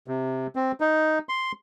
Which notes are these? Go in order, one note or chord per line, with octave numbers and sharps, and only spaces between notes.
C3
C4
D#4
C6